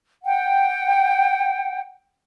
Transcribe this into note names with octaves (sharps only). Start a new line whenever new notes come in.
F#5 G5